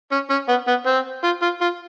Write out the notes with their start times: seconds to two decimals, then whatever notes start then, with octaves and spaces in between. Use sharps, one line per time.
0.12 C#4
0.30 C#4
0.48 B3
0.67 B3
0.86 C4
1.24 F4
1.42 F4
1.61 F4